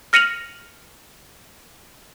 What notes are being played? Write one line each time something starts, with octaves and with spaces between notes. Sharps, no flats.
F6 A#6 C#7 D#7 F7 F#7